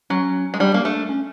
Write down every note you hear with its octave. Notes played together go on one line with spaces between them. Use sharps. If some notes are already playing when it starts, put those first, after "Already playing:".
F#3 C#4
G#3
G3 D4
A#3
A3 D4
C#4